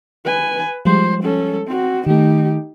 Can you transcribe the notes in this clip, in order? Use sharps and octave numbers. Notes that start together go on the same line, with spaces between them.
B4 G#5
F3 G3 G#3 C5
C#4 A4
C4 F#4
D#3 A3 D#4 G4